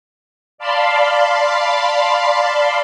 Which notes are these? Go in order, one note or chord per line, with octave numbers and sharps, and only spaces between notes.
D5 F5 A5 B5 C6